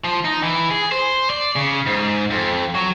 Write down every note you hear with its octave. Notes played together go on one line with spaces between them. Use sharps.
F3
D#4
E3
G#4
C5
D5
C#3
G#2
F2
F#3